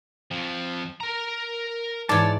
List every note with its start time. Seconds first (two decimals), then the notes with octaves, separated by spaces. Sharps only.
0.31 F2 F3
1.00 A#4 A#5
2.09 G#2 E3 C#5 D5 A5